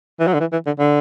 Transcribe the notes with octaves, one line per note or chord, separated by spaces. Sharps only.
E3
F#3
D3
E3
E3
D3
D3